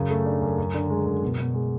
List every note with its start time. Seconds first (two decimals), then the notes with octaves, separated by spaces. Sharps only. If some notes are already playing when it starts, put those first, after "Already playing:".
Already playing: F#2 C#3
0.10 A3
0.26 D4
0.42 F#2
0.58 F#2
0.74 D3
0.90 G#3
1.06 F#2
1.22 B2
1.38 B2
1.54 G#3